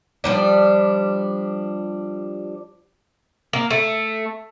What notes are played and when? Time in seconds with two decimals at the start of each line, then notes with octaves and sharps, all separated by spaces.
0.24 F3 G3 D4
3.53 A#3
3.70 A3